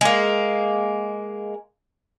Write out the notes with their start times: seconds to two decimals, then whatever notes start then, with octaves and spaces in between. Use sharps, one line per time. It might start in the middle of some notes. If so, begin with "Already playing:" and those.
0.01 G#3 A#3